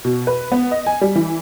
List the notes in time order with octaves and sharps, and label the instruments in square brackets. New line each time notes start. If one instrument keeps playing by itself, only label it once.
[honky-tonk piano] B2
B4
B3
D#5
G#5
G3
E3